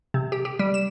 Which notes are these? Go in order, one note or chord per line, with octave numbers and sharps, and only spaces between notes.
C3
G4
G4
G3
E7